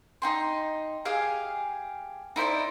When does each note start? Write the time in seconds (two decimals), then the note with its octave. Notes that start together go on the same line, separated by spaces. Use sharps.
0.22 D#4 G5 C6
1.05 G4 G#4 F5 G#5
2.36 D#4 E4 C5 D5